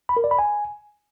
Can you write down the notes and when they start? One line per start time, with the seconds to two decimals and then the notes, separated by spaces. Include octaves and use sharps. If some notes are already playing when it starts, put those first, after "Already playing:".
0.09 B5
0.17 A#4
0.24 D5
0.31 B5
0.39 G#5